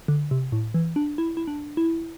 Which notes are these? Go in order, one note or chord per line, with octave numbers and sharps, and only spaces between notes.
D3
C3
A2
E3
D4
E4
E4
D4
E4